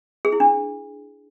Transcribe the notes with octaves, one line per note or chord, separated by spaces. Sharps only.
G#4
E4
D4